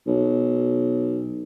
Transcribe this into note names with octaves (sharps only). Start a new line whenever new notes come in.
B1